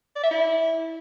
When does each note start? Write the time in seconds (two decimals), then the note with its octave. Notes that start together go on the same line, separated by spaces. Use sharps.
0.16 D5
0.23 E5
0.31 E4